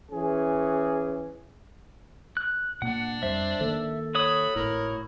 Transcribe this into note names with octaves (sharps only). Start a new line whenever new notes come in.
E3 C#4 G#4
F#6
A#2 A#3 D4 F#5
F2 G3 C5 E5
D#3 A#3 A4
F#4 C#5 B5 D#6
G#1 A2 E4 A#4